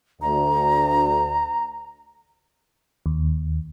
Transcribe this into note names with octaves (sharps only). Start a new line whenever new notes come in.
D2 A#5
D#2